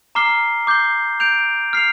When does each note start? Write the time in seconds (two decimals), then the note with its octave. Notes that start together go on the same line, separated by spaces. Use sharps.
0.15 A#5 D6 F6 C7 G7
0.67 D6 G6 C7 G7
1.20 G6 D7 F7
1.73 F6 C7 F7